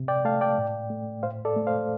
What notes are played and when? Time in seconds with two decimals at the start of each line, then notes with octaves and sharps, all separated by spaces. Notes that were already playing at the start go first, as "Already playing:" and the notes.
Already playing: C3
0.08 D5 G5
0.25 A3 F5 A5
0.41 D5 G5
0.58 A2
0.90 A3
1.23 A2 C5 F5
1.45 A4 D5
1.56 A3
1.67 C5 F5